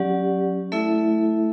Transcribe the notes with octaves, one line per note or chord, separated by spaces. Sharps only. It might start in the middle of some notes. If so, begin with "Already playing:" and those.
Already playing: F#3 C#4 G4 D5 F#5
A3 E4 A4 E5